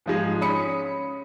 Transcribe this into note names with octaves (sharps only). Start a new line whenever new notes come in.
G#2 F3 G#3
C#4 B5 D#6 C#7